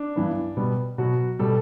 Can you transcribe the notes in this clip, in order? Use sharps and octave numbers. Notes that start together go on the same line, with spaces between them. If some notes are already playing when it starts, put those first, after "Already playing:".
Already playing: D4
G2 E3 B3
B2 G3 B3
B2 F#3 B3 F#4
B2 G3 A4